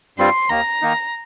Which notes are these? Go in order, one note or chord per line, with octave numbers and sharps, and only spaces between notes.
G2 G3 C4 F4 C6
D#2 D#3 A#3 A#5
D#3 A#3 D#4